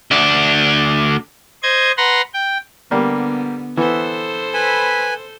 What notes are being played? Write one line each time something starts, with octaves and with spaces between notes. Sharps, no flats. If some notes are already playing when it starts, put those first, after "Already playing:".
D2 D4
C5 D#5 G#6
B4 F#5 A#5 C6
G5
D3 G3 A#3 B3
E3 B3 A4 C5
B4 G#5 B5